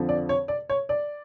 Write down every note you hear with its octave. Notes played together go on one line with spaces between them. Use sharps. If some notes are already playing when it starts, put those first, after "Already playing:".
Already playing: F2 D3 F3
D5
C#5
D5
C#5
D5